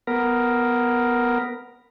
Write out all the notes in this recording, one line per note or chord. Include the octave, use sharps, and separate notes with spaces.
B3 A#4